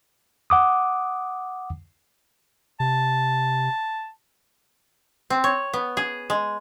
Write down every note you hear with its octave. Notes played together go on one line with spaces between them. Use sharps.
F#5 D6 D#6
C3 A5
C4
C#5
B3
G#4
G#3